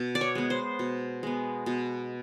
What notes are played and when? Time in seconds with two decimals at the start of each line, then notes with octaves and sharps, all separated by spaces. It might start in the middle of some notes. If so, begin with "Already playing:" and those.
Already playing: B2
0.15 D5
0.21 C#5
0.35 G#3 B3
0.50 C5
0.79 B2
1.23 G#3 B3
1.66 B2